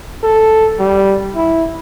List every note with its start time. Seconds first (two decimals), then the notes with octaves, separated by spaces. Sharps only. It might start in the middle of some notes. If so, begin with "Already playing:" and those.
0.24 A4
0.80 G3
1.36 E4